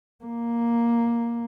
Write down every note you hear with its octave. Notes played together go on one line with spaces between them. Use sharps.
A#3